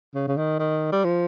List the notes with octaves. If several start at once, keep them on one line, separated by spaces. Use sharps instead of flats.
C#3
C#3
D#3
D#3
G3
F3